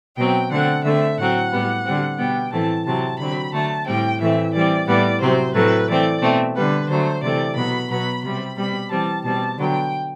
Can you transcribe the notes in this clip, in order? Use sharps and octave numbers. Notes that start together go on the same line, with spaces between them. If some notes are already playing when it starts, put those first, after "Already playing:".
B2 F#3 C4 G5
D3 A3 C4 F#5
D3 A3 C4 E5
A2 F#3 C4 F#5
A2 G3 B3
D3 G3 C4
B2 G3 B3 G5
A2 E3 A3 C4 A5
C3 F#3 C4 A5
D3 F#3 C4 B5
D3 F#3 A3 A5
A2 G3 C4 G5
A2 E3 A3 C4 E5
E3 G3 C4 D5
A2 G3 B3 D5
C3 F#3 C4 C5
A2 F#3 A3 C4 B4
E3 A3 C4 D5
B2 A3 C4
D3 G3 B3 B4
D3 F#3 A3 C5
C3 E3 A3 C4 D5
B2 F#3 B3 B5
B2 F#3 B3 B5
C3 G3 C4 B5
B2 G3 C4 B5
E3 G3 C4 A5
B2 G3 C4 A5
D3 F#3 B3 G5